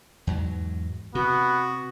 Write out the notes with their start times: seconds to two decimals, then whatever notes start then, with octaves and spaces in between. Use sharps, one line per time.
0.27 E2 G#2 F#3
1.15 C3 B3 F#4